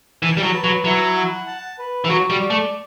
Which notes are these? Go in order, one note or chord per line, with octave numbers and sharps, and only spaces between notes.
E3 A5
G3
F#3
B4
F#3
F#3 E4
F#5
A5
B4
E3
F#3 F#4
G3
D5
A3